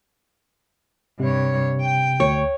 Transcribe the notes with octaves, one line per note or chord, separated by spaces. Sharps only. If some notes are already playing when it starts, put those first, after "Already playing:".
G2 C3 C#5
G5
D2 C#5 C#6